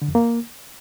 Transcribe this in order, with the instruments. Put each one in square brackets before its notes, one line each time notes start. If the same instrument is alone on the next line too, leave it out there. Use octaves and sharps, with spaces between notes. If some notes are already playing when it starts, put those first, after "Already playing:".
[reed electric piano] D3
F2
A#3